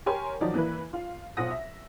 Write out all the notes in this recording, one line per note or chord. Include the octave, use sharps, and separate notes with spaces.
G4 A#4 C#5 G5 G#5 C6
D#3 F3 F#3 D#4 D5
E3 A#3 E4 B4
F4 F5
B1 F4 C5 F#5 D#6 A#6
E5